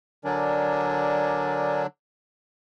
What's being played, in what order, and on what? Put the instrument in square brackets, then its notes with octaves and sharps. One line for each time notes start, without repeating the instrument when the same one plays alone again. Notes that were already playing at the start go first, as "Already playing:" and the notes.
[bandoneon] D3 F#3 D4 [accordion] A#4 D5 G#5